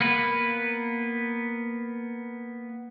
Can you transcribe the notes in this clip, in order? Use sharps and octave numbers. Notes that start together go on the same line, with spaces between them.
A#3 B3 B4